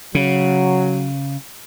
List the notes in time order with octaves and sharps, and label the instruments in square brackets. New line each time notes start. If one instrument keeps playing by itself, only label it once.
[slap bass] C#3 [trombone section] F#3